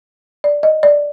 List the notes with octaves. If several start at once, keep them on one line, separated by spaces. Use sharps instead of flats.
D5
D#5
D5